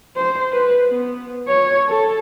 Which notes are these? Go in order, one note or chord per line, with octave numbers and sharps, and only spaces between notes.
C5
B4
B3
C#5
A4